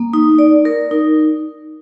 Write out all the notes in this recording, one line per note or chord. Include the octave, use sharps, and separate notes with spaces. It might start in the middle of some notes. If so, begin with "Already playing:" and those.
Already playing: A#3
D#4
D5
A#4
D#4